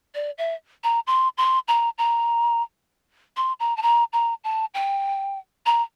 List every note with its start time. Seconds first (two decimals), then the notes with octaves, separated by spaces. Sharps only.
0.14 D5
0.38 E5
0.83 A#5
1.07 C6
1.37 C6
1.68 A#5
1.98 A#5
3.36 C6
3.60 A#5
3.77 A5
3.82 A#5
4.13 A#5
4.44 A5
4.74 G5
5.66 A#5